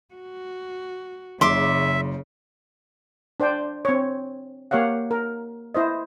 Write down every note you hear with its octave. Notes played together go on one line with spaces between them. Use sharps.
F#4
F#1 C#3 E5 C6 D6
D4 C5 D5 G5
C4 C#5
A#3 G4 C#5 F5 F#5
A#4
E4 C5 D#5